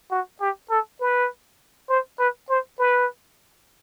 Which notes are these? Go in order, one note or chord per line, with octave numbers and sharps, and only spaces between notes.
F#4
G4
A4
B4
C5
B4
C5
B4